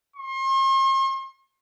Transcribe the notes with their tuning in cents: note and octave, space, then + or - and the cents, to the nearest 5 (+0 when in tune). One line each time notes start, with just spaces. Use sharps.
C6 +45